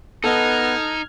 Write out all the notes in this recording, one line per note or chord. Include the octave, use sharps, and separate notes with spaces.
B3 D#4 A4 D#5 F6 G#6